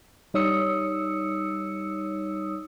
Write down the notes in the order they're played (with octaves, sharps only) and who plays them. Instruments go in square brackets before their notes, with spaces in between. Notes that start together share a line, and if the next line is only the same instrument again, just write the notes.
[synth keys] G3 D#4 C#5 D#6 E6 C#7